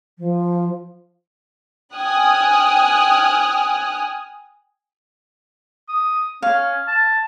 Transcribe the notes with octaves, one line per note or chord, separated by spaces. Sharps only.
F3
G5 G#5 D#6 F6 F#6
D#6
C#4 F5
A5